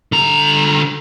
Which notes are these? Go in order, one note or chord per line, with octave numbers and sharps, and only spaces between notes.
D3 A#5